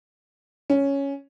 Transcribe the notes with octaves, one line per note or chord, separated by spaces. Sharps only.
C#4